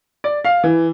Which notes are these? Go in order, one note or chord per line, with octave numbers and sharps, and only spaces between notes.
D5
F5
E3